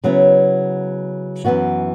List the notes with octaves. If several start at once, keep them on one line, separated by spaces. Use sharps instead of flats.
C#3 F#3 B3 E4
F#2 E3 B3 F#4